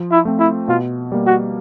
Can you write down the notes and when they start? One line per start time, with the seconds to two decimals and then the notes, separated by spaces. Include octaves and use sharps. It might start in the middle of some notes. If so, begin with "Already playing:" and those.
Already playing: F3
0.11 E4
0.25 A3 C4
0.39 E4
0.68 B2 F4
1.12 G3 A#3
1.26 F#4